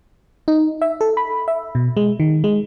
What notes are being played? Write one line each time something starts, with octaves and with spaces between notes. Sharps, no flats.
D#4
E5
A4
B5
E5
B2
G#3
D#3
G#3